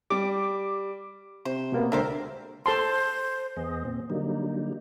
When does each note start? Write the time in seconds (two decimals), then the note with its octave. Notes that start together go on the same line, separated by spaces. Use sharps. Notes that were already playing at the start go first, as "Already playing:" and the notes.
0.10 G3 D6
1.45 C3 C5
1.72 B2 A#3 B3
1.92 C#2 D3 D4 G4 A#4 C5 E5
2.66 A4 C5 A5 C6
3.56 E2 B3 G#4 D#5
3.85 A#2 C4
4.10 D3 F#3 G3 A#3 D#4